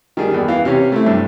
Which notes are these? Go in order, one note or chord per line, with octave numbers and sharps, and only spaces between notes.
D#3 G3 G#4 D5
E2 A#3
E3 F5
C3 C#4
A3 C4 E4
G2